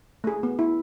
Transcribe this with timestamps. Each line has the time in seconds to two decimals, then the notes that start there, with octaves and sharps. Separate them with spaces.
0.24 A3 G#4
0.43 B3
0.59 E4